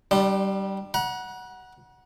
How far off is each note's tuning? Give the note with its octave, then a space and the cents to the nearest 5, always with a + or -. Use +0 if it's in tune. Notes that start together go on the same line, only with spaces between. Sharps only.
G3 -15 D4 +25 C6 -25
F#5 +0 A#5 +45